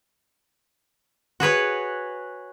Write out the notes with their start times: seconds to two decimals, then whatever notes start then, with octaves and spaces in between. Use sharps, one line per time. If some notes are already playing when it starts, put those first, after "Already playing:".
1.40 F#4 G#4 B4 C#5